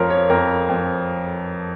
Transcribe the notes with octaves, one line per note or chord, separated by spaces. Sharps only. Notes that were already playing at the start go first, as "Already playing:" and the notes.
Already playing: F2 F3 A#4 C#5
C#5
F2 A#4
F2